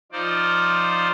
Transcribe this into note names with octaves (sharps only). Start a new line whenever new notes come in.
F3 D#4 F4 C5 D5